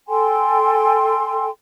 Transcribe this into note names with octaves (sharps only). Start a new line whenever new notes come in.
A4 G5 G#5 C6